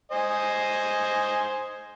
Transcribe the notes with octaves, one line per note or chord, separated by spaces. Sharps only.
C5 D#5 G#5